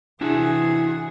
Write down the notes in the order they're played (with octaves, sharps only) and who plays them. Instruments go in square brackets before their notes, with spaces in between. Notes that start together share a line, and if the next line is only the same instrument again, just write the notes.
[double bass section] C3 E3 [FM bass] D4 [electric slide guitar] E4 F#4 [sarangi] G#4